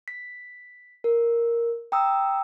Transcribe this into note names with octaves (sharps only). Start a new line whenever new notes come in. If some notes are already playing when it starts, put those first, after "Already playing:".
B6
A#4
G5 A#5 D#6 E6